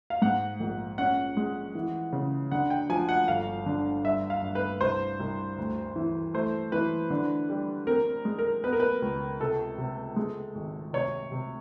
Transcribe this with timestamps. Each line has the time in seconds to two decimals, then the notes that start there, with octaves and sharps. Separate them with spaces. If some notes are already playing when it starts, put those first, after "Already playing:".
0.10 F5
0.22 G#2 F#5
0.60 A#1
0.98 C#4 F#5
1.37 G#3
1.75 E3
2.13 C#3
2.52 D3 F#5
2.70 G5
2.89 F3 G#5
3.09 F#5
3.28 G1 F5
3.66 D3
4.04 G2 E5
4.30 F5
4.42 G2
4.55 B4
4.81 C2 C5
5.20 C2
5.58 D2
5.96 E3
6.34 A3 C5
6.72 E3 B4
7.10 D3
7.49 G3
7.87 C4 A#4
8.25 G#3
8.39 A#4
8.63 B3 B4
8.73 A#4
8.80 B4
9.02 C#2
9.40 C3 A4
9.78 C3
10.16 G#3
10.55 G#1
10.93 C3 C#5
11.32 C3